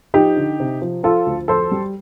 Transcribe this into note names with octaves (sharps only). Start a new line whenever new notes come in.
F3 D#4 G4
D3
C3
F3
F3 F4 A4
D2
F2 A4 C5
G3